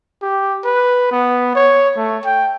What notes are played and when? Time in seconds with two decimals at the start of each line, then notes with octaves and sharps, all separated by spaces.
0.22 G4
0.65 B4
1.11 B3
1.56 C#5
1.97 A3
2.25 G5